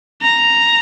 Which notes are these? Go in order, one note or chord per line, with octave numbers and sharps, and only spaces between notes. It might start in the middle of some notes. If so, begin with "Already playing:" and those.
A#5